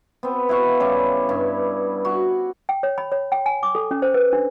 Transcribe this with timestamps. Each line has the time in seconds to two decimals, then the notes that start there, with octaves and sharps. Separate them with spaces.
0.23 B3 C4
0.49 E4 F5 F#5 C#6
0.80 C#3 G3 E4
1.29 G2
2.05 F#4
2.69 G5
2.83 C#5
2.98 B5
3.12 C#5
3.32 G5
3.46 G#5
3.63 D6
3.75 A4
3.91 C#4
4.02 C5
4.14 B4
4.33 D4